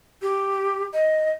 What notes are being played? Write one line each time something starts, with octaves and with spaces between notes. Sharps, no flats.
G4
D#5